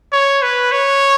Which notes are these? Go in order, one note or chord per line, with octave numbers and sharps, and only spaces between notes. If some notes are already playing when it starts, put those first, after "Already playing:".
C#5
B4
C#5